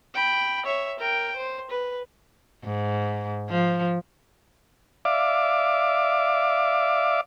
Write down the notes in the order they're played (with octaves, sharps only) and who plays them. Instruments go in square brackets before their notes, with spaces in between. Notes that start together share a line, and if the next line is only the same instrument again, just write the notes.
[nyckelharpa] G5 B5
C#5 E5
A#4 G5
C5
B4
[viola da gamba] G#2
F3
[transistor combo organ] D5 E5 F5 D6